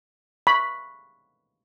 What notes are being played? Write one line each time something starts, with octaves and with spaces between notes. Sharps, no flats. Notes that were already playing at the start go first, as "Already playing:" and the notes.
B5 C#6